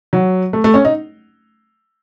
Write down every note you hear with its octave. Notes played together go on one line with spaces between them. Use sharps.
F#3
A3
A3
C#4
D#4